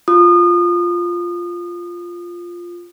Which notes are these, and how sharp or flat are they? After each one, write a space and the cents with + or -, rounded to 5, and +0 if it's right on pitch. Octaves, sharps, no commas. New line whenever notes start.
F4 +0 D#6 -30